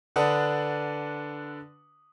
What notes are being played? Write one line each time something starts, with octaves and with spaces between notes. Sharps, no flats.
D3 D4 B4 F#5 D#6